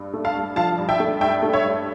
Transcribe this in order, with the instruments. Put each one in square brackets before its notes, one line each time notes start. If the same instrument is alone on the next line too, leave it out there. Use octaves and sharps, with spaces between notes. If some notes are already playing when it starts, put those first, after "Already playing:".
Already playing: [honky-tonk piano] G2
A3
F5 A5
G2
F3 F5 A5
G2
E5 G5
A3
G2 E5 G5
A3
C#5 E5
G2